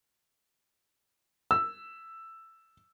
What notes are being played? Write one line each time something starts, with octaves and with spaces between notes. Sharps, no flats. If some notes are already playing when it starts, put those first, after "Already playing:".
E6